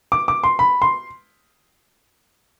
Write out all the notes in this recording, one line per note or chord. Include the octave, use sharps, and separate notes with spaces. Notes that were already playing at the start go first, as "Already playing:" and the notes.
D6
D6
C6
B5
C6